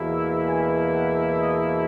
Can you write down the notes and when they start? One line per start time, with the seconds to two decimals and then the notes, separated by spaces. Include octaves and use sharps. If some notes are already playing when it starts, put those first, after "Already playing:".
Already playing: E2 B2 A#3 E4
0.14 E5
0.45 G#5
0.92 F#5
1.39 D#5